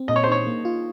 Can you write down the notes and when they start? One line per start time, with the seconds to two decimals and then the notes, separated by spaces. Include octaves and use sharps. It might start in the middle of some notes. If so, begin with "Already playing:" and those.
Already playing: C4
0.08 A#2 D#5
0.16 C#5
0.24 C5
0.28 D#4 C#5
0.47 A#3
0.65 F4